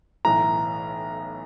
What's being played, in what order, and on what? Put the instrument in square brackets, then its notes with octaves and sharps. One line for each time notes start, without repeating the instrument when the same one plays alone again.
[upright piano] B1 A2 E3 [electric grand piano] A#5